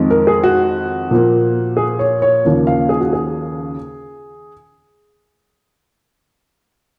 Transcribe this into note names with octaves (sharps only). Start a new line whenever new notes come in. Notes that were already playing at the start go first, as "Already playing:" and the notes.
Already playing: F2 D#3 G#3
A#4
G#4
F#4
A#2 F3 A#3
G#4
C#5
C#5
D#2 C#3 F3 A#3
F5
G#4
F#4
G#4